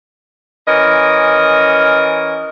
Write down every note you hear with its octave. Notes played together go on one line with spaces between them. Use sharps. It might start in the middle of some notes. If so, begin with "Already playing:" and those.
E3 C#4 A#4 D#5